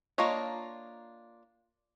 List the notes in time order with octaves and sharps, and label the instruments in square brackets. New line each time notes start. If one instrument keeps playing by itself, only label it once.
[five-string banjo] A#3 D4 F4 C#5 D#5